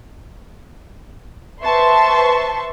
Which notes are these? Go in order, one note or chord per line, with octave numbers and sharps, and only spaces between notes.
B4 C5 E5 A5 C6 C#6